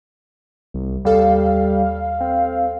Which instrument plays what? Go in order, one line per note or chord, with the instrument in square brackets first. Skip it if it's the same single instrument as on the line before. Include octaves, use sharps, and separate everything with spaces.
[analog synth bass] C2
[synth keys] D#2 A4 [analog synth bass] G3 [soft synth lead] F5
[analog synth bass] C4